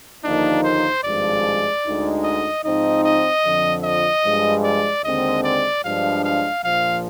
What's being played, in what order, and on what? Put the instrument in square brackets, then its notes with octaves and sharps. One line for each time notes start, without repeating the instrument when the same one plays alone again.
[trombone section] D#2 D3 F3 A#3 D#4 [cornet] D4
[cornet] C5
[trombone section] G#1 G2 F3 G#3 [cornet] D5
[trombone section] D2 D3 G#3 D#4
[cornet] D#5
[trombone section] G#2 F3 C4 D#4 [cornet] D#5
[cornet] D#5
[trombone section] F2 D3 F3
[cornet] D#5
[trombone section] G2 F3 G#3
[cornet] D5
[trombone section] D#2 D3 G#3 C4 [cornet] D#5
[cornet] D5
[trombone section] G2 F3 G#3 D4 [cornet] F5
[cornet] F5
[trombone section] A#1 A#2 F3 [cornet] F5